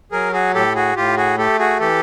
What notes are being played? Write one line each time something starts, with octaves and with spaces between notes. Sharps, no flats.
F#3 G#4 A#4
F#4 G#4
A2 G4 A4
F#4 G#4
A2 F4 G4
F#4 G#4
A3 G4 A4
F#4 G#4
E3 G4 A4